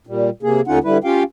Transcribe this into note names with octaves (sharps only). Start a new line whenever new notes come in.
A#2 G3
C3 A#3 G#4
D#2 D3 C#4 D#4 F4 F#5
D3 G3 E4 B4
C#4 F4 G4 F5 G5